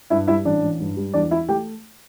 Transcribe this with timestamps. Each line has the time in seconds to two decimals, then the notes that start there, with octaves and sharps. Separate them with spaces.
0.10 G2 E4 E5
0.27 G3 E4 E5
0.45 A1 D4 D5
0.63 A1
0.80 G2
0.97 G3
1.14 E2 D4 D5
1.31 E3 E4 E5
1.49 A3 G4 G5